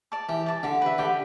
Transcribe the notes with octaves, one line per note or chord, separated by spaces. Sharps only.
D5 A5 D6
E3 G4
D5 A5 D6
D3 G4
B4 E5
D3 G4